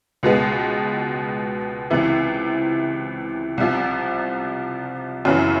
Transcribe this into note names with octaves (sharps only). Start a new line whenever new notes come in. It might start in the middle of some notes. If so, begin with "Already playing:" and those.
C#2 B2 G#3 B3
C#2 C3 E3
C2 C3 F3
F#2 C#3 E3